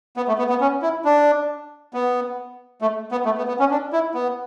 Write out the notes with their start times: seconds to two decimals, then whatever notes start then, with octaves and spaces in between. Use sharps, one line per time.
0.17 B3
0.28 A3
0.39 B3
0.49 B3
0.61 C#4
0.82 E4
1.05 D4
1.94 B3
2.82 A3
3.12 B3
3.25 A3
3.38 B3
3.48 B3
3.60 C#4
3.71 D4
3.93 E4
4.14 B3